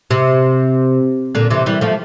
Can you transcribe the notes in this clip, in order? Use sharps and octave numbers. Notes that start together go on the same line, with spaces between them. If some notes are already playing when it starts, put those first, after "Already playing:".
C3
A#2 D3
C3 E3
E3 G3
F3 A3